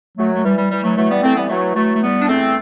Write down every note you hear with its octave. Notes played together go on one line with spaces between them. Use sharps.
F#2 F#3 A3
A3
E3 G3
G3
E3 G3
F#3 A3
E3 F#3 A3
G3 B3
E3 A3 C4
G3 B3
E3 F#3 A3
E3 F#3 A3
A3
E2 G3 B3
D4
E2 A3 C4